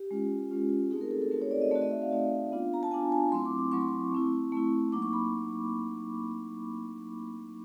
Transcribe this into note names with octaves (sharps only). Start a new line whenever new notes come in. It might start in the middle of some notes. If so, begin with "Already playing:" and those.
Already playing: G4
G#3 C#4 F4
G#3 C#4 F4
A3 C4 D#4 F#4 G#4
A#4
A4
A4
A3 C4 D#4 F#4 A#4
C#5
D5
D#5
A3 C4 D#4 F#4 D5
D#5
E5
F5
A3 C4 D#4 F#4
B3 D4 F4
A#5
A5
B3 D4 F4 G#5
G#5
F#3 A3 C4 E4 C6
D6
D6
F#3 A3 C4 E4 C#6
C6
C#6
A3 C4 E4
A3 C4 E4
F#3 A#3 D#4 D6
C#6
B5